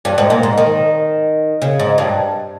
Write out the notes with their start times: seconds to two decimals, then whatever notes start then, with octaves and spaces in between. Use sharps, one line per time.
0.05 G2
0.18 G#2
0.30 A#2
0.43 G#2
0.58 D#3
1.62 C#3
1.79 G#2
1.98 G2